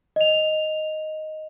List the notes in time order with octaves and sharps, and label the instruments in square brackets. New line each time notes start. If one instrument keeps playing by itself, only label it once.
[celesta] D#5 F7